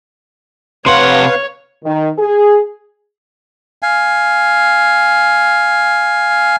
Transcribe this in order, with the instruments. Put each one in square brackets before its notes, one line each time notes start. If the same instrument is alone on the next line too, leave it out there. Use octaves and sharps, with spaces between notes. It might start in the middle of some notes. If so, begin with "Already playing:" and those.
[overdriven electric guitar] C3 F#5 [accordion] B4 F5 [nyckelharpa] C#5 [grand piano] C6
[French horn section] D#3
G#4
[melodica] F5 G#5